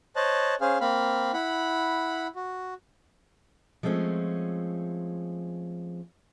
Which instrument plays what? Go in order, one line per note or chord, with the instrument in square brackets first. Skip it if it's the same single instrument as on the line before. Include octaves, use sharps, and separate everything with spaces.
[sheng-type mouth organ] C5 C#5 D#5 A5 F#6
C#4 G#4 C5 F5
A#3 C4 F5 B5
E4 F#5 B5
F#4
[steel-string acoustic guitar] F3 G#3 A3 C4 C#4